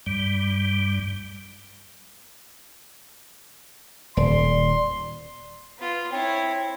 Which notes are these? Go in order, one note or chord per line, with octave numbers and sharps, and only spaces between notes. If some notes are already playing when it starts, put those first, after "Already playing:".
G2 G3
D#1 D5 C6
B3 F4
C4 E4 C#5